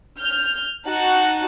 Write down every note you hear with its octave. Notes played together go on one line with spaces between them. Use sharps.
F6 G6
D#4 F#4 A5 F#6